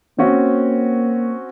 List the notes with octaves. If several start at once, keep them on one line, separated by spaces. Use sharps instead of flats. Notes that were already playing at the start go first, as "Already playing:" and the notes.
A#3 C4 C#4 F#4